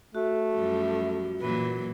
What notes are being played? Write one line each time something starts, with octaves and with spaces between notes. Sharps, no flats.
A3 F#4
F#2 F3 G3
A#2 E3 F#3 B4